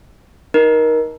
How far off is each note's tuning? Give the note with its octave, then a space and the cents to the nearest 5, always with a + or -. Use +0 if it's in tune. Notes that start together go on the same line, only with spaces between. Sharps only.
D#4 +10 A#4 +20